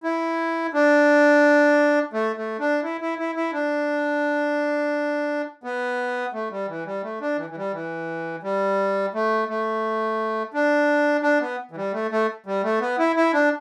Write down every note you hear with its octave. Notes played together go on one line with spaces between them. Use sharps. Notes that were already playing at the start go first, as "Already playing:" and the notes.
E4
D4
A3
A3
D4
E4
E4
E4
E4
D4
B3
A3
G3
E3
G3
A3
D4
E3
E3
G3
E3
G3
A3
A3
D4
D4
B3
E3
G3
A3
A3
G3
A3
B3
E4
E4
D4